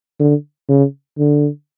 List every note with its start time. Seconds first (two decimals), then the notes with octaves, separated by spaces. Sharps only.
0.20 D3
0.69 C#3
1.18 D3